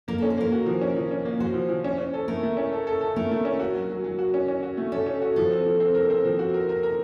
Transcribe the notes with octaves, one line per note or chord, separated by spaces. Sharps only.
A#3 A#4
C#4 A4
C5
A#3 A#4
F#4
F3
C#4
F3
C#4
A#3
F#4 C5
F3
F3
C#4
C#4
A4
A3 A#4
A3
C#4
A4
A4
A4
A3 A#4
A3
C#4
F#4
F#3
F#3
F#3
F#4
C#4
C#4
F#4
A3
C#4 A4
C#4
F#4
F3 A4
C4
F3
C4
A#4
C4
F3
F#4
A#4
A#4
A#4